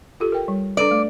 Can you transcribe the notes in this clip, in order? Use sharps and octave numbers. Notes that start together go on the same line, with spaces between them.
F4 G4 A4
A#4 G5
G3
D4 A4 B4 D5
A3